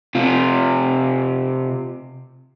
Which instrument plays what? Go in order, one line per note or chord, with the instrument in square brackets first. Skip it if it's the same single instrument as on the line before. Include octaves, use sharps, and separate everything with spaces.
[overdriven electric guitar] C3 F4